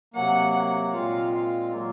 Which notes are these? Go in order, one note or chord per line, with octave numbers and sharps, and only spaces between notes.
C3 F#3 A#3 F#5
A#2 G#3 C4 F4 F5
A#2 F#3 A#3